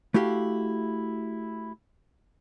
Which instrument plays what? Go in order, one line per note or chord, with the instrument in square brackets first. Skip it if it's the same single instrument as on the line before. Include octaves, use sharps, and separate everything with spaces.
[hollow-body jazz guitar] A3 E4 F#4 G4 F5